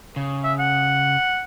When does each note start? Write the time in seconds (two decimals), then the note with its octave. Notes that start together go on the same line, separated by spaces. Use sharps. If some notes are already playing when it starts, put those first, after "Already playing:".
0.16 C#3
0.44 E5
0.59 F#5